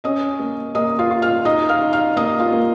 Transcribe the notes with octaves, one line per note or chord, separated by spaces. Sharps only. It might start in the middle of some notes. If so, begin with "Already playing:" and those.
C#4 D#5 D#6
A#3
A#3 D#5 D#6
F4 F5
F4
F5 F6
D#4 D#5 D#6
F5 F6
D#4
F5 F6
A#3 D#5 D#6
F4 F5
A#3